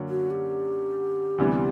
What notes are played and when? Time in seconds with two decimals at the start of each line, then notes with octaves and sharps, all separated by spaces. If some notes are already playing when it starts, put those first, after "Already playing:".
Already playing: F#2 D3 F#3 A#3 C#4
0.09 F#4
0.30 G4
1.38 D2 C3 E3 G3 B3